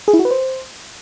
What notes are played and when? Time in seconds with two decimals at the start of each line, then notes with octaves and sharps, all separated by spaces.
0.08 G#4
0.13 E4
0.19 F#4
0.25 B4
0.31 C5